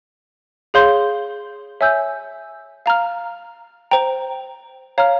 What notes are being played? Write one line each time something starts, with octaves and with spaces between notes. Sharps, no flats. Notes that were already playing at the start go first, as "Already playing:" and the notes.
G#4 C#5 F5 C6 G6
C#5 E5 G#5 E6 G6
F5 A#5 F6
C5 G5 A#5
C#5 F5 A#5 F6